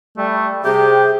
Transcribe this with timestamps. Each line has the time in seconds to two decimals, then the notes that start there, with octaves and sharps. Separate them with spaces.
0.17 G3 A3
0.64 C3 G4 G#4